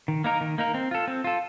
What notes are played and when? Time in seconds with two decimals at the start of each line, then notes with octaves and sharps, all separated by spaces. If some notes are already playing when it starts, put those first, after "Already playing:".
0.08 D#3
0.24 A#3 D#4 A#4
0.41 D#3
0.58 A#3 D#4 A#4
0.74 C4
0.91 F4 A4
1.08 C4
1.24 F4 A4